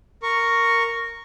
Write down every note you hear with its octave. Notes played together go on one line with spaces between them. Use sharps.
A#4 C#6